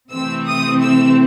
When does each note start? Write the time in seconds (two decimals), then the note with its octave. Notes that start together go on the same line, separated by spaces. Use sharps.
0.10 C3 E3 A3 C4 E6
0.46 D#6
0.82 E6